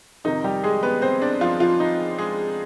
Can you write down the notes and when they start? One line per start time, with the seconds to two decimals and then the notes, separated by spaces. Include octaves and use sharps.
0.24 F2 C3 D#3 D#4
0.44 G3 G4
0.64 G#3 G#4
0.83 B3 B4
1.02 C4 C5
1.22 D4 D5
1.41 F3 F4
1.60 F3 F4
1.80 D#4
2.18 G#3 G#4